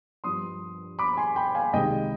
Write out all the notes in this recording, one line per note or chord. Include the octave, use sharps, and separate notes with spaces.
G2 F3 B3 C6 D#6
B5 D6
G#5 C6
G5 B5
F5 G#5
C2 C3 D#3 G#3 D#5 G5